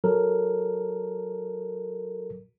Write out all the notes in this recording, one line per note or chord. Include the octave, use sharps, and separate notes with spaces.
F#3 A4 A#4